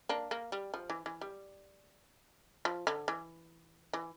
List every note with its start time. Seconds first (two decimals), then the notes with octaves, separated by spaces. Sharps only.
0.09 A#3 D4
0.31 A#3
0.52 G3
0.74 F3
0.90 E3
1.06 E3
1.21 G3
2.65 F3
2.87 D3
3.08 E3
3.93 E3